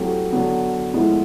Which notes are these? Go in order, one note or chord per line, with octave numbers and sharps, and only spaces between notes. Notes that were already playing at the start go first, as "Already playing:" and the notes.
Already playing: F#3 A3 C4 E4 G4
D3 F#3 B3
A2 F3 G#3 B3 E4